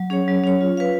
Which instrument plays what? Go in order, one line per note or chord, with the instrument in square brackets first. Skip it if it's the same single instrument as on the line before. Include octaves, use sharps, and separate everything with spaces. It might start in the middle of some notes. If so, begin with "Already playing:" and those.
Already playing: [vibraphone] F#3
C#4 G#4 C#5
F#3
C#4 G#4 C#5
F4
B4 F5